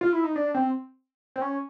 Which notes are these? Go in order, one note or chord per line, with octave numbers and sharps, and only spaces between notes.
F4
E4
D#4
D4
C4
C4
C#4